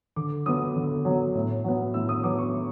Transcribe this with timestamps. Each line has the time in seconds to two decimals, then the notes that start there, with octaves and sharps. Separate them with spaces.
0.16 D3 D6
0.46 F#3 B3 D#6
0.76 D3
1.05 F#3 B3
1.35 A2
1.64 F#3 B3
1.94 A2 E6
2.09 D#6
2.24 F#3 B3 D6
2.39 C#6